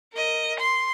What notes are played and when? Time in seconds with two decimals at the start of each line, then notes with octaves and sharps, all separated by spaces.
0.13 A#4 D#5
0.60 C6